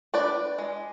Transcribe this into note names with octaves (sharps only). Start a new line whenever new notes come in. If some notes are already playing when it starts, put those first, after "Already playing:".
D4 B4 D5
G#3